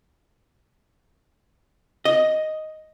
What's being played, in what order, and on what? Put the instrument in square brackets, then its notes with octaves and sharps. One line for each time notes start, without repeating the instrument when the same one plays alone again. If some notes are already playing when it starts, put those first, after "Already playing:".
[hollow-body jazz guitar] D#5